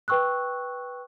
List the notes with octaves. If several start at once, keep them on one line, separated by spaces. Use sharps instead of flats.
B4 G5 C#6 E6 F#6